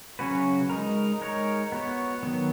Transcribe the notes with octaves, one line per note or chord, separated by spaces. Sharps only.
C#3 F#3 C#4 F#4 B4
G#3 D#4 A#4
G#3 D#4 A#4 C#5
B3 F#4 C#5
D#3 F#3 B3